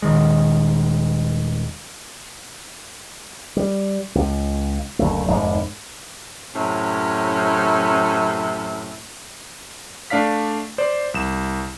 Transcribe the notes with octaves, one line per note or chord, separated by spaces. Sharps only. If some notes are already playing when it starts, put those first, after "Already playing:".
D#1 D#3 G#3
G3
C#2
F#1 D2 A3
F1 D#2 G#2 C3
F#2 A2 C3 C#4 E5
A3 D4 D5 F5 B6
C5 D5
C2 E7